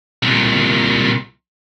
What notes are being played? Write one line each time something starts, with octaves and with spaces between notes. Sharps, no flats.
C2 A#2